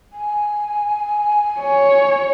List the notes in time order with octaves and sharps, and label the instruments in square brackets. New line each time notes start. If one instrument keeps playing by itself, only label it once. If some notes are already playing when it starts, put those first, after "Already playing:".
[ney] G#5
[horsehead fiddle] C#5